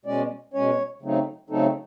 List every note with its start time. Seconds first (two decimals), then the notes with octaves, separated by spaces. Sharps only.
0.05 B2 G#3 C#4 D5
0.54 B2 G#3 C#4 C#5
1.02 C#3 F#3 A3 C4 D#4
1.50 C#3 F#3 A3 C4 D#4 A4